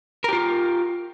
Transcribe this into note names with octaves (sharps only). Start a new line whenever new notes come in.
F4 G4 A#4